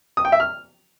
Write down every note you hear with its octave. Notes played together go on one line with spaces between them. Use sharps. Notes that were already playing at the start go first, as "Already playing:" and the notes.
D#6
G5
E5
F6